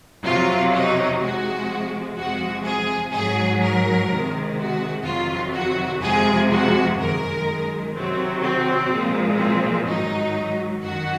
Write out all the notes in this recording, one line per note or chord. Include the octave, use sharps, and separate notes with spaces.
F2 C3 F#3 F4
D#4
C3 F3 G#3 F#4
F2 C3 F3 G#3 F#4
G#4
G#2 F#3 G#4
A#4
C3 D#3 G#3
F#4
F2 C3 D#3 F#3 F4
F#4
F2 C3 F3 G#3 G#4
F#4
F#2 D#3 G#3 A#4
C3 D#3 F#3 C4
C4
A#2 F3 G#3
C4
G#2 D#3 F#3 D#4
F#2 D#3 F#4